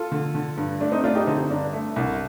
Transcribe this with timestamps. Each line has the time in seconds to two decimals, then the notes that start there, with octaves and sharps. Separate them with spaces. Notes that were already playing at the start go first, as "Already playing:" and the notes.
Already playing: F4 A4
0.12 D3
0.35 D3
0.57 G2
0.80 A3 D4
0.92 C4 D#4
1.04 A3 D4 F4
1.15 D#4 G4
1.27 D3 C4 D#4
1.50 G2 D4
1.73 A3
1.96 C2